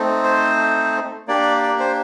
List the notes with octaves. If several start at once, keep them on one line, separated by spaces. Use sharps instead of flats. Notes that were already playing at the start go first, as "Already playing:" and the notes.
Already playing: A3 C4 D#4
C5
A#3 D4 G4 D5
D5
C5